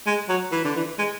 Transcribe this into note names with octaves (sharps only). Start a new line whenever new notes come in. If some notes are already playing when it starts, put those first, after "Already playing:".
G#3
F#3
E3
D3
E3
G#3